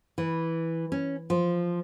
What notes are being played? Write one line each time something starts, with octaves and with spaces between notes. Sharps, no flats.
E3
C#4
F3